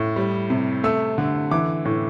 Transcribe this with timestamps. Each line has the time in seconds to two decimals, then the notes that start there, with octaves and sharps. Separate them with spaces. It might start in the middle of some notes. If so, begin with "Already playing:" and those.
Already playing: A2
0.16 G3
0.50 C3
0.84 A3 E6
1.18 D3
1.51 E3 D6
1.85 A2